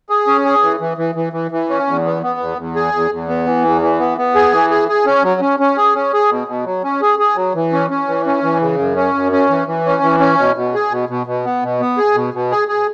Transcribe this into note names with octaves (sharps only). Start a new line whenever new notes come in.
G#4
C#4
G#4
E3
E3
E3
E3
E3
E3
C#4
E2
B3
B3
E2
E2
G#4
E2
E2
B3
E3
E2
E3
B3
B3
G#4
E3
G#4
G#4
C#4
F#3
C#4
C#4
G#4
C#4
G#4
B2
B2
F#3
C#4
G#4
G#4
F#3
E3
C#4
C#4
E3
C#4
E3
C#3
F#2
C#4
F#2
C#4
E3
E3
C#4
E3
C#4
B2
B2
G#4
B2
B2
B2
B3
B2
B3
G#4
B2
B2
G#4
G#4